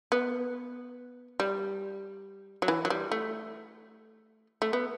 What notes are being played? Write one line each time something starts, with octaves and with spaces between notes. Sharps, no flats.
B3
G3
F#3
E3
F#3
G3
A3
A3
B3